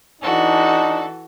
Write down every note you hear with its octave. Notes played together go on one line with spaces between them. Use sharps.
E3 D4 D#4 F#4 A4